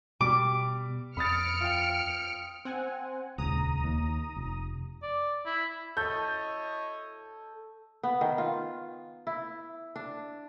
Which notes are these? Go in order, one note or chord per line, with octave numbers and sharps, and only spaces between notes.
B2 G3 D6
F2 B5 D#6 F6 A6 C#7 D7
F4 F5 G5
C4 F#5 G#5
D#1 C#2 A#5 D#6
D#2
F1
D5
E4
E4 A4 C#5 D#5 G6
B3
D#3
F4
E4
D4